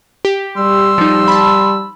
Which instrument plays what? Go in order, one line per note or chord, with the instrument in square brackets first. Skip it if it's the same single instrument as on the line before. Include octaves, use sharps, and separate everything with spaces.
[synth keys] G4
[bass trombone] G3 [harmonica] C6 E6
[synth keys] F3 D#4
A5 B5